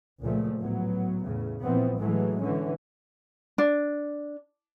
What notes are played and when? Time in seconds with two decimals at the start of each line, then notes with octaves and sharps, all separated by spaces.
0.22 C#2 A#2 F3 A3
0.59 A2 F#3 B3
1.22 E2 A2 C#3
1.62 A#2 E3 F3 B3 C4
1.97 A2 E3 F#3 G#3 A3
2.40 D3 E3 C#4
3.58 D4